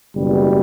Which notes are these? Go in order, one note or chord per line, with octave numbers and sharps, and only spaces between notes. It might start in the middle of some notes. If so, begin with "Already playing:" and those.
F#1 E2 B2 G3